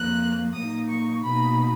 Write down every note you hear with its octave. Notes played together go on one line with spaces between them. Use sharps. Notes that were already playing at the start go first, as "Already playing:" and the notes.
Already playing: F2 F3 A#3 F#6
A#2 F#3 A#3 D#4 D#6
C#6
B2 A#3 D#4 B5